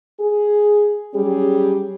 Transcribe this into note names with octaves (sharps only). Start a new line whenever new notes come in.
G#4
F#3 G3 C#4 G4 G#4